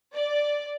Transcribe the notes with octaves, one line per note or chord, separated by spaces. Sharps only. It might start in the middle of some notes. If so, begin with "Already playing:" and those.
D5